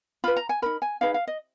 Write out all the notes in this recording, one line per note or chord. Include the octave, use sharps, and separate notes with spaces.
F4 B4 B5
A#5
G#5
D#4 A#4 B5
G#5
D#4 G#4 B4 F5
F5
D#5